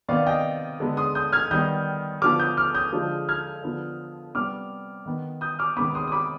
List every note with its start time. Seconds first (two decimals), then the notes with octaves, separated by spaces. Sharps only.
0.09 C3 D#3 B3 D5 F5
0.26 D#5 G5
0.80 D3 G#3 B3
0.97 C6 D#6
1.15 D#6 G6
1.32 F6 G#6
1.51 D#3 G3 B3 D#6 G6
2.22 D3 F3 B3 D6 F6
2.40 D#6 G6
2.57 D6 F6
2.75 D#6 G6
2.92 D3 F3 G#3
3.29 F6 G#6
3.63 D3 F3 B3
4.35 C3 G3 B3 D6 F6
5.06 D#3 B3
5.41 D#6 G6
5.59 D6 F6
5.76 C3 D#3 G#3 B3 B5 D6
5.95 C6 D#6
6.08 D#6
6.12 B5 D6